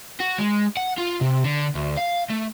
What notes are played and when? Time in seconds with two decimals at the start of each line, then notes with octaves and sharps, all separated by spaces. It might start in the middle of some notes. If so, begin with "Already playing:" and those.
0.20 F#4
0.38 G#3
0.77 F#5
0.98 F4
1.21 C3
1.44 D3
1.75 D2
1.97 F5
2.30 A3